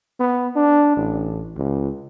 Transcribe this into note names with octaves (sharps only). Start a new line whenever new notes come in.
B3
D4
A1
C#2